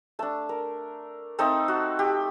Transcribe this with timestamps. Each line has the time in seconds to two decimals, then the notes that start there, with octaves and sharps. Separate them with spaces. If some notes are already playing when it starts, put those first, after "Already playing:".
0.19 A3 D4 A5
0.49 A#4
1.39 A3 C4 D#4 A4
1.68 F#4
1.99 G4